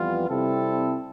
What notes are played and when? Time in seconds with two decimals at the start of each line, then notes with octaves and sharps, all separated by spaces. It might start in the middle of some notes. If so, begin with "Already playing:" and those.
Already playing: F2 E3 G3 B3 F4
0.29 C3 G3 C4 E4 A4